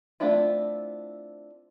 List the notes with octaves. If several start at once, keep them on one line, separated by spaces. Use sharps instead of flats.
A3 C4 D4 E4 F4